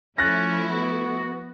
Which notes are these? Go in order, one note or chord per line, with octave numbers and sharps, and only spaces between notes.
F3 A3 C#4 E4 F#6 A6 A#6
B3 F#4